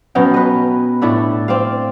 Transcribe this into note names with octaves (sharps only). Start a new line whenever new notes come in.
B2 F#3 C#4 G5
B4 D#5
A2 A3 D4 A4
C4 D5 F5